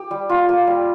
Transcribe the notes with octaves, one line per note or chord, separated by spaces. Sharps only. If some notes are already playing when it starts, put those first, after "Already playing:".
Already playing: G4
G3
F4
A#3
G3